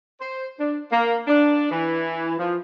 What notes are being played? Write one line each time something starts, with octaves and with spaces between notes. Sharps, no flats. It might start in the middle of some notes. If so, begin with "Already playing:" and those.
C5
D4
A#3
D4
E3
F3